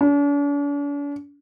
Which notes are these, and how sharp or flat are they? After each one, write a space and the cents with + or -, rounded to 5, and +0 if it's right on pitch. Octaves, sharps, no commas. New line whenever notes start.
D4 -45